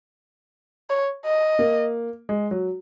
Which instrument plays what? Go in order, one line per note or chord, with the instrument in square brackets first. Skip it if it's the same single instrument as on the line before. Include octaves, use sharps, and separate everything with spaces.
[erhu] C#5
D#5
[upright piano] A#3
G#3
F#3